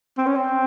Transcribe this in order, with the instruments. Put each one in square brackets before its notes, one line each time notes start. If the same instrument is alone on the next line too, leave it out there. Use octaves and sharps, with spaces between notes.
[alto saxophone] C4
C#4
C4